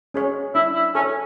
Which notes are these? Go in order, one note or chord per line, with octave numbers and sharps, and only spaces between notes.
C#4 G#4 C#5
D4 E4
E4
C#4 A4 C#5